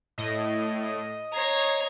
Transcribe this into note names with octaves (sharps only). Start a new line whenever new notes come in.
A2 D#5
C#5 A#5 G#6 C7